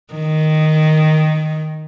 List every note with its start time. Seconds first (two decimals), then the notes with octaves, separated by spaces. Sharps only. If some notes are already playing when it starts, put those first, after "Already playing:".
0.14 D#3